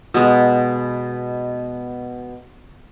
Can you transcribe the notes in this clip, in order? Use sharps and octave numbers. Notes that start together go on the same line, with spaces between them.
B2 G#3